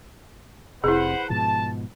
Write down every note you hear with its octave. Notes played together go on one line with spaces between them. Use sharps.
F1 C3 E4 G#4 B4 C5 F#5
G#2 B2 F3 A5